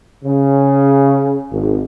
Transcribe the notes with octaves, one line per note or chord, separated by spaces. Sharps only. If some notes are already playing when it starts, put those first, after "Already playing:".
C#3
G#1